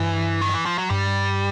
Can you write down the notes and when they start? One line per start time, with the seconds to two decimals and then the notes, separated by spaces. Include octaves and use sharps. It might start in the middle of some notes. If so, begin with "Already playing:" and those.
Already playing: G2 E3
0.42 D#3
0.54 E3
0.66 F3
0.78 F#3
0.90 G2 G3